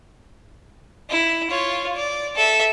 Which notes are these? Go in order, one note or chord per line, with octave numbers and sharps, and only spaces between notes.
E4
F4 C#5
D5
A4 E5